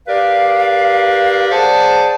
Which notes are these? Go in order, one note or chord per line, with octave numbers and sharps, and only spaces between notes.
G4 A#4 B4 D5 F5
G#4 C5 D5 F#5 A5